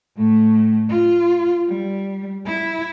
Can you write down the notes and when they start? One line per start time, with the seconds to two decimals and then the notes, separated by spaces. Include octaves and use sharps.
0.17 A2 A3
0.89 F4
1.68 G3
2.46 E4